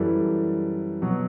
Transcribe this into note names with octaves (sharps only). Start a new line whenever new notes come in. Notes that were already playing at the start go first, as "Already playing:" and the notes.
Already playing: F#2 E3 G3 A4
B2 F#3